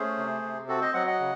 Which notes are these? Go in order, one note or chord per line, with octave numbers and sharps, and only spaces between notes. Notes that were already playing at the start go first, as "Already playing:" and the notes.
Already playing: A3 C#4 G#4 C5
C3
C3
C4 F#4 A4
C5 D#5
F#3 D#5 F#5
D#5 F#5
C#3